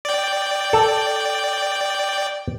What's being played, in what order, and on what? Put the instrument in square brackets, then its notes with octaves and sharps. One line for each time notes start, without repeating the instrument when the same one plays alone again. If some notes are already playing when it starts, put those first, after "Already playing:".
[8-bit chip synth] D5 G5
[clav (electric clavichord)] A4